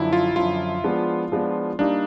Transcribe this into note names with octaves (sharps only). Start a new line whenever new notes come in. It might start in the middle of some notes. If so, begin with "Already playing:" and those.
Already playing: F#2 D3 F3 E4
F4
F#2 D3 F3 F4
F3 G#3 B3 D4
F3 G#3 B3 D4
G3 A#3 D4 D#4